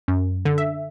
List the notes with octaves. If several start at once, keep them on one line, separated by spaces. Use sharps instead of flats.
F#2
D3
E5